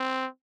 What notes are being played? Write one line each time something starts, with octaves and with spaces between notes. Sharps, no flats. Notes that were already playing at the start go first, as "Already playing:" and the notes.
Already playing: C4